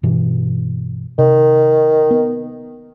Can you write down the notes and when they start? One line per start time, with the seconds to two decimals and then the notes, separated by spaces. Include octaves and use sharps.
0.03 G2 B2 E3
1.18 C3 D#3
2.11 B3